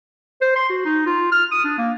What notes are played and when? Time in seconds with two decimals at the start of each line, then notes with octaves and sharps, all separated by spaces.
0.42 C5
0.56 C6
0.70 F#4
0.85 D#4
1.06 F4
1.32 F6
1.51 D#6
1.64 D4
1.78 A#3